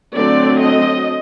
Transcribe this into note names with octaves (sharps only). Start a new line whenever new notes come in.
D3 F#3 A3 C4 D5
D#5